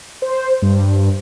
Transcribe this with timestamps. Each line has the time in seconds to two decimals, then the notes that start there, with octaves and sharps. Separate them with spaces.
0.22 C5
0.62 G2